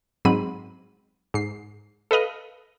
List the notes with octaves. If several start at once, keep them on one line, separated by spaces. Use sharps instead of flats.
G#2 F#3 C4 B5 D#7
G#2 C7
A4 B4 D#5 F5